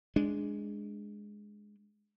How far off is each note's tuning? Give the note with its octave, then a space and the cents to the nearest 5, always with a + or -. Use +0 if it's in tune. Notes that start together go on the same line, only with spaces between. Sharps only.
G#3 +0 D4 -5